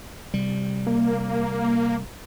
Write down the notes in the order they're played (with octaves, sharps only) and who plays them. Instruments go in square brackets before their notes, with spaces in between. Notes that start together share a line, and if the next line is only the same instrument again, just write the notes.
[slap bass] C3 G3
[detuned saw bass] A#3